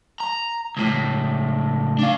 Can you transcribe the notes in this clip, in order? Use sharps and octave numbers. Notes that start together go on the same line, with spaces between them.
A#5
C#2 A2
D4 F5